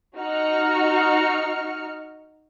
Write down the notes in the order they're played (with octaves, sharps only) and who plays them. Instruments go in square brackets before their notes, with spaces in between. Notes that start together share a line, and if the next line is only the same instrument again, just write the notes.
[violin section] D#4 F#4 F6 C#7